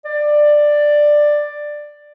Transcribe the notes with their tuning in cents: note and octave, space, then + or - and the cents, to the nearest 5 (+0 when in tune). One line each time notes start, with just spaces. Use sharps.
D5 +10